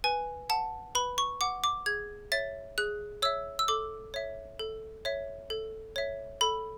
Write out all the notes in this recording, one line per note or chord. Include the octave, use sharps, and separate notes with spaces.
B4 G#5
F#5 A5
B4 B5
C#6
F#5 D6
D6
G#4 G#6
C#5 E5 A6
G#4 F#6
C#5 E5 E6
E6
A4 D6
C#5 E5
A4
C#5 E5
A4
C#5 E5
A4 B5